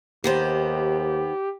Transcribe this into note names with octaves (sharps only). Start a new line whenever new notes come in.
D#2 D#3 B3 G4 C5